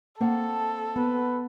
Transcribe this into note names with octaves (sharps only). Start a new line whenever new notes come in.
A#3 C4 A4 F#5 A5
B3 B4